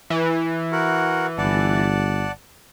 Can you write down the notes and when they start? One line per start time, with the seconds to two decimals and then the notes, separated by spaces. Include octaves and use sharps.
0.10 E3
0.72 F#4 A#4 F#5
1.38 G1 D5 F#5 A5